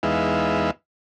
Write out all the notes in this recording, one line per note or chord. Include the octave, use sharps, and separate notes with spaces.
E2 G#3 B3 D#4 E5 F5